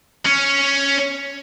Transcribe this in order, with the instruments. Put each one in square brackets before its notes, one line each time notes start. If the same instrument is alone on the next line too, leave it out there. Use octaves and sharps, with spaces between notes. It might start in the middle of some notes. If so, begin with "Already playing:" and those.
[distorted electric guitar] C#4